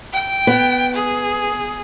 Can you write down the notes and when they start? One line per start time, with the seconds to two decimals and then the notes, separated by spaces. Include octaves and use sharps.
0.13 G5
0.47 B3
0.95 G#4